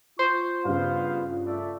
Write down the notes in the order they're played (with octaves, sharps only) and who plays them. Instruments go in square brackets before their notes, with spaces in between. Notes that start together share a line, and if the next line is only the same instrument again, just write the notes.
[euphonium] F4 [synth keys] C5 [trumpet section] C#6
[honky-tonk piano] G2 C#3 [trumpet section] B3 F5
[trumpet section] A3 D5 E5